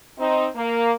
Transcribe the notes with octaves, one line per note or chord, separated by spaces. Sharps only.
C4 D#4
A#3